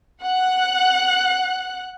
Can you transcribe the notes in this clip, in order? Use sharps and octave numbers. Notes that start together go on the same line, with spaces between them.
F#5 F#6